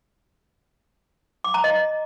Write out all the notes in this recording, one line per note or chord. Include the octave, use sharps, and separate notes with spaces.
D6
A#5
D#5